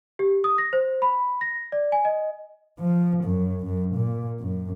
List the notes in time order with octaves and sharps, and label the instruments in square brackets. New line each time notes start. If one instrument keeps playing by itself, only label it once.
[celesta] G4
D#6
A#6
C5
B5
A#6
D5
G#5
D#5
[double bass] F3
F#2
F#2
A#2
F#2